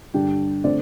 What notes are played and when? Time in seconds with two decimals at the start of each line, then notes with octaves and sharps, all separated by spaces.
0.14 G2 D3 G3 D4 G5
0.64 D3 A3 C4 D5